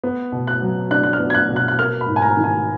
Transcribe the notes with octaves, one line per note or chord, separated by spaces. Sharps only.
B3
B2
F#6
F#3
D4 F#6
F#6
F6
B3
G#6
F#6
B2
F#6
F#6
A#3 F6
B5
G#2
G#5
A#5
D#3
G#5